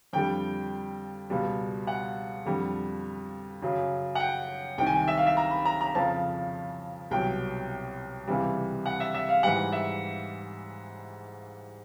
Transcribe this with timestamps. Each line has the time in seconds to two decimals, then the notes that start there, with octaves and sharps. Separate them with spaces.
0.13 F2 D3 G3 G5
1.30 C#2 B2 G3
1.87 F#5
2.45 F2 D3 G3
3.62 F#2 C#3 F#3
4.15 F#5
4.20 G5
4.78 C2 C3 D#3 G5
4.87 G#5
4.93 G5
5.08 E5
5.17 F5
5.27 E5
5.37 A#5
5.51 B5
5.65 A#5
5.81 A#5
5.95 F2 C#3 F3 A5
7.11 C2 B2 F#3 G5
8.28 C#2 C3 E3 G3
8.86 F#5
9.00 E5
9.14 E5
9.29 F5
9.43 G#2 E3 G3 F#5
9.72 E5